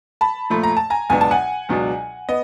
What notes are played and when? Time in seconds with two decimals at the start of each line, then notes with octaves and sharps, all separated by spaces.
0.21 A5 B5
0.50 A#2 F3 A3 B5
0.63 A#5
0.77 A5
0.90 G#5 A#5
1.10 C#2 B2 F#3 B3 D4 G#5
1.21 A5
1.31 F#5 G#5
1.69 C#2 B2 F#3 B3 D4
2.29 B3 D#5